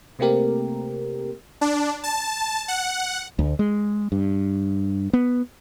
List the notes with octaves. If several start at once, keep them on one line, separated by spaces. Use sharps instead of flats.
C3 A3 A#3 C4 G4 A#4
D4
A5
F#5
D2
G#3
G2
B3